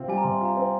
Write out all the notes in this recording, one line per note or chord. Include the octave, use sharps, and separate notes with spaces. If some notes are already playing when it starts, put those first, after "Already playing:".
Already playing: C3 C4 F4
G3 G#5
A#5
C3 C6
F4 A#5
C4